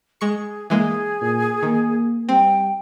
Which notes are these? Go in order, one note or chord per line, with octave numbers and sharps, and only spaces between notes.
G#3 G#4 C#6 C#7
E3 G#3 A#3 G#4
A#2
D#3 A#3
G3 C4 G5